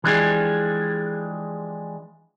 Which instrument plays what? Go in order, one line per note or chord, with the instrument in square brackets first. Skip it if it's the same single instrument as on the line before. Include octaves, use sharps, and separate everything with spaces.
[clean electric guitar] E3 F3 G#3 D4 G4 G#4